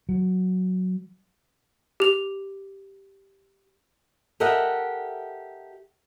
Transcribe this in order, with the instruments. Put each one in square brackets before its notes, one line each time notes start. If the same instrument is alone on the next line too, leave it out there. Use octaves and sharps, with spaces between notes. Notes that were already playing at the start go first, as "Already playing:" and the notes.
[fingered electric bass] F#3
[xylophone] G4 F7
[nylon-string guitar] G4 A4 A#4 D#5 E5 F#5